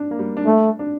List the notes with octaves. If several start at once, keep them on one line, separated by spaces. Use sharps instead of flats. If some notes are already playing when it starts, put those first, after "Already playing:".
Already playing: D4
A#3
G3
D4
A3
D4